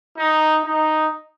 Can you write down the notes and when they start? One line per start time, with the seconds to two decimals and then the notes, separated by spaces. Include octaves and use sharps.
0.18 D#4
0.66 D#4